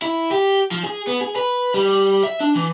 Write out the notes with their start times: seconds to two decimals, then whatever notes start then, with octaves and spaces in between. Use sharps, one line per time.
0.02 E4
0.31 G4
0.71 F3
0.83 G#4
1.07 B3
1.21 G#4
1.36 B4
1.74 G3
2.23 E5
2.40 D4
2.55 E3